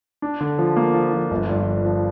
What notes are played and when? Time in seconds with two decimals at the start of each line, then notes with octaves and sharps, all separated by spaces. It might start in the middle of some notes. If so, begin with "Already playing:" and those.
0.22 D4
0.41 D3
0.59 F3
0.77 A#3
0.94 F3
1.13 F3
1.31 G1
1.49 G2
1.66 F3
1.85 F3